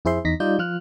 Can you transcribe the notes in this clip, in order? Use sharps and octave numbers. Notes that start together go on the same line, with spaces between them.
F2 E4 G#4 C5 E5 C6
E2 D#4 A#6 B6
G3 D#4 F4 D5 D#5 G6
F3 F4 F6 F#6